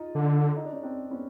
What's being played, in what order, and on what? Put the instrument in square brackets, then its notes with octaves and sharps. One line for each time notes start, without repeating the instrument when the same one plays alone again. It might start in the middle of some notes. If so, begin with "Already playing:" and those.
Already playing: [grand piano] D#4 F4
[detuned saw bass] D3
[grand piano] D#4
D4
C#4 D#4
C4 D4
B3 C#4